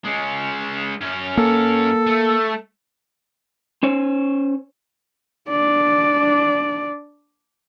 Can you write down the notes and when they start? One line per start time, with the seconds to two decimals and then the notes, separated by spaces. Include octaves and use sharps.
0.05 G#3 C#4
1.01 F#2 C#4
1.37 A#3 A4
2.06 A3
3.83 C#4 C5 C#5
5.50 D4 D5